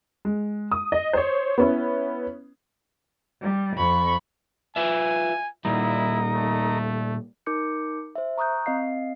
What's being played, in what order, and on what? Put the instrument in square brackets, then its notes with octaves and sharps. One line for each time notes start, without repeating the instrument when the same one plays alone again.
[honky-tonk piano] G#3
D#6
D#5
C5 C#5
B3 C#4 E4
[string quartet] G3
F2 B5 C#6
[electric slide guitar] F4 B4 E5 [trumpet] G#5
[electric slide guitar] A#2 G3 [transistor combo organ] D#4 A#4 A#5 [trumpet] E4
[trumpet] A3
[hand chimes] D#4 A#4 D6 G6 C#7
C5 E5
A#5 C#6 D#6 F#6 G6
C4 D#5 F5 C7